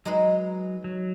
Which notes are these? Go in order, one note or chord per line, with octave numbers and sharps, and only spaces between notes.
F#3 G#3 D#4 G#4 B4
F#3